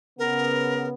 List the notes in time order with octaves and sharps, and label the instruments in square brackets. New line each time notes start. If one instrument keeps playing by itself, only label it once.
[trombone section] C#3 B3 [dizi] A#4